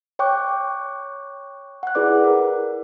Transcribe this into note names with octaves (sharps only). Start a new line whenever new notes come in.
C#5 G5 C#6 D6 F#6
F#5 F#6
E4 G#4 B4 D5 D6
A#4